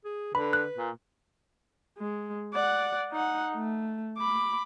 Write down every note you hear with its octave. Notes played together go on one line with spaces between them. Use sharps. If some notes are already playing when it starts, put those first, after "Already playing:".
G#4
D3 B4 B5
F#6
A#2
G#3
D5 F#5
D#4 F#5
A3
B5 D6